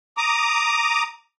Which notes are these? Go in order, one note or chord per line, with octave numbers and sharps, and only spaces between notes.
A#5 D6 D#6